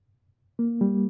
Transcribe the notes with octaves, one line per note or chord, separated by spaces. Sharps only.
A#3
G3